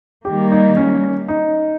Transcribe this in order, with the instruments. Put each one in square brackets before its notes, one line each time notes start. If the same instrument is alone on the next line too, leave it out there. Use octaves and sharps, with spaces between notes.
[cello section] D#3 G3 A#3 [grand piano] G4
[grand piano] D#4
C#4
D#4